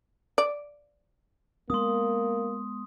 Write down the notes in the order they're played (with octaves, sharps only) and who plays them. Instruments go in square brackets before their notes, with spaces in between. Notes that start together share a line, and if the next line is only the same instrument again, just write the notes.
[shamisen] D5
[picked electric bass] G#3 B3 [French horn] A#3 [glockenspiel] C6 D#6